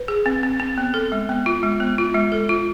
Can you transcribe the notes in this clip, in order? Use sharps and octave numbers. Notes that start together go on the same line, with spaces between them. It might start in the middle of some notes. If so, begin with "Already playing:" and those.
Already playing: B4
G#4
C4
C4
C4
B3
A4
G#3
B3
F4
G#3
B3
F4
G#3
A4
F4